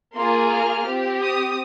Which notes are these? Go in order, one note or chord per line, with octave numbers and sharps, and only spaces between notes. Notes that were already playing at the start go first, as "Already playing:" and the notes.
A#3 F4 G#4 C6
F6
C4 G4
D#6